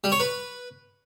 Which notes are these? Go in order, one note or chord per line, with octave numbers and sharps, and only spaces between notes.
G3
C#5
B4